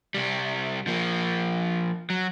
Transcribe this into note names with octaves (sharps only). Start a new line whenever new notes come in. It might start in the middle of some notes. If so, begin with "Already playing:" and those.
C2 G3
F3 A#3
F#3